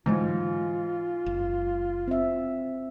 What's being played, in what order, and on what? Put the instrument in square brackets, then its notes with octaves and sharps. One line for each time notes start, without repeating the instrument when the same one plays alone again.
[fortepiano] G#2 [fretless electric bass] D3 E3 F#3 [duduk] F4
[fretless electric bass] F#1
[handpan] C4 E5